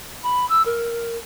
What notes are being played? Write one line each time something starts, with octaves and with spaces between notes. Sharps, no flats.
B5
E6
A#4